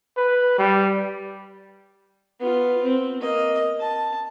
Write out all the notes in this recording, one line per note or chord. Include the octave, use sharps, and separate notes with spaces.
B4
G3
B3 F4
C4
A#3 D#5
A5